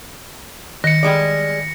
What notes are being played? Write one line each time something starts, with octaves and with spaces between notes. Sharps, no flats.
D#3 A#6 C#7
G3 G#3 D5